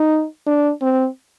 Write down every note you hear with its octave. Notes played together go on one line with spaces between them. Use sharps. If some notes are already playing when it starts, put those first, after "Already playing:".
Already playing: D#4
D4
C4